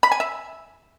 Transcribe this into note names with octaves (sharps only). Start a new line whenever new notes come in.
B5
G#5
E5